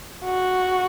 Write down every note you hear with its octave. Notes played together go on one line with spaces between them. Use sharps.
F#4